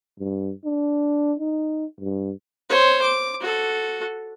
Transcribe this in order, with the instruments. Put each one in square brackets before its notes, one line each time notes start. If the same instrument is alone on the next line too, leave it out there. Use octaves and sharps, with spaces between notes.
[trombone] G2
D4
D#4
G2
[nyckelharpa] C5 C#5
D6
F#4 A4